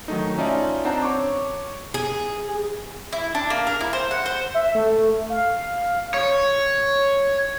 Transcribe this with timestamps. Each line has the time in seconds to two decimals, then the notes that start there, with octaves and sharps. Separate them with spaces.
0.08 D#3 F#3 A3 D#4
0.38 C#4 D#4 F4 D5 E5 A5
0.85 C4 D4 C5 F#5 A5 A#5
1.03 C#5 C#6 D6
1.94 G#4
3.12 E4
3.35 D4
3.50 A#3
3.67 A#4
3.80 E4
3.93 C5
4.11 F#5
4.26 C5
4.54 E5
4.75 A3
5.30 F5
6.14 C#5